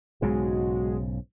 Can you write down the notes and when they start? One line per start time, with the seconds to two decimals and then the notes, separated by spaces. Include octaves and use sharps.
0.22 B1 G#2 C#3 G#3 F#4